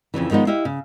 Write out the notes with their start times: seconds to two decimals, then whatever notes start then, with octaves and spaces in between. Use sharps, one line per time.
0.14 F2 A#2 C#3 E3
0.30 D#3 F3 G#3 B3 D#4
0.47 E4 G4 D#5 F5
0.65 C#3